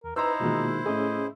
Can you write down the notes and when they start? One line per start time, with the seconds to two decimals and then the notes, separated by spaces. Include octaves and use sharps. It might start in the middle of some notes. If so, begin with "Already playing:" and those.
0.04 E2 A#4
0.16 D#4 E4 B4 C5 A#5 C6 E6
0.40 B2 D#3 G#3 A#3 F4 F#4
0.86 A2 C#4 G#4 D#5